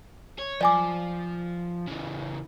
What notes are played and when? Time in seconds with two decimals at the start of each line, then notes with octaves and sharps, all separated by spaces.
0.39 C#5
0.61 F3 D5 G#5 D6
1.87 C#3 E3